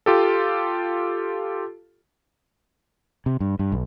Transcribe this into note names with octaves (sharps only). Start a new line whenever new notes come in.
F4 G4 A4
C3
G2
G2
B1